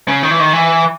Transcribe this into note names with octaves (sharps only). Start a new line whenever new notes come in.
C#3
D#3
E3
D#3
E3